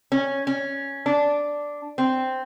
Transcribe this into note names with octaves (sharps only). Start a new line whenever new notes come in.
C#4
C#4
D4
C4